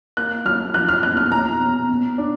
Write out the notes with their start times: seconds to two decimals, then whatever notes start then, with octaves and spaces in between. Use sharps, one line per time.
0.17 A#3 F#6
0.45 F#3 F6
0.74 F3 F#6
0.88 F6
1.03 B3 F#6
1.17 F6
1.31 B2 A#5
1.60 B2
1.89 B2
2.18 D4